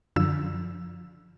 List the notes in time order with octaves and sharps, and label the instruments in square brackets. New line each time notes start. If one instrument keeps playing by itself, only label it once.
[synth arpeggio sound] F#2 D3 F3 E6